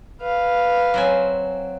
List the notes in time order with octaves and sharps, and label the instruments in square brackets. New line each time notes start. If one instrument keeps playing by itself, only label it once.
[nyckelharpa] B4 F5
[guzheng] F#3 C4 G#5